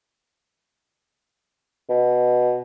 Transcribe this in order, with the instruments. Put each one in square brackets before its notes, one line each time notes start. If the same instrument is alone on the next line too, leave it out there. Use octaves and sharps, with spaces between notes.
[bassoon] B2